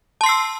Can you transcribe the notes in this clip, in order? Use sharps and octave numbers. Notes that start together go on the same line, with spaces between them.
A5 C6 E6 C7